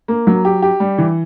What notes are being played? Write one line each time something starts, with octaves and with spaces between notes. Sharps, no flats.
A#3
F#3
G4
G4
G3
E3